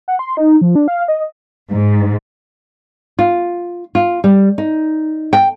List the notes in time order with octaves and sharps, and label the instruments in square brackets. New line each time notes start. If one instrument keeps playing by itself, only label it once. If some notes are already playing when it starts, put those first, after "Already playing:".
[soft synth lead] F#5
C6
D#4
F3
D4
F5
D#5
[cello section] G#2
[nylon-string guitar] F4
F4
G3
D#4
G5